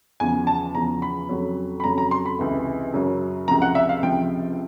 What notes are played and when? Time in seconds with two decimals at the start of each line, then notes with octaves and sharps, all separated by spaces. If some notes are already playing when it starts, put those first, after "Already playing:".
0.20 E2 C#3 F3 G#5
0.47 A5
0.75 E2 C#3 F3 A#5
1.02 B5
1.29 F2 C#3 F#3
1.80 B5
1.84 F2 C#3 F#3 A#5
1.98 A#5
2.11 C6
2.26 B5
2.39 C#2 C3 E3
2.94 F#2 C#3 F#3
3.48 C#2 C3 F3 A#5
3.62 F#5
3.75 E5
3.89 F5
4.02 C#2 C3 F3 G5